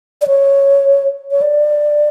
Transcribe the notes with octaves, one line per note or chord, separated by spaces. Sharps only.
D5
C#5
C#5
D5